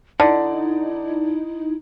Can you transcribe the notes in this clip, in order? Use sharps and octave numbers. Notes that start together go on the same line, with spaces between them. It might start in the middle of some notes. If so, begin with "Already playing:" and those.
D3 D#4 E4 D5